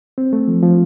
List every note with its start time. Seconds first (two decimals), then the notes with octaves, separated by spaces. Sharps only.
0.18 C4
0.33 A3
0.48 F3
0.63 F3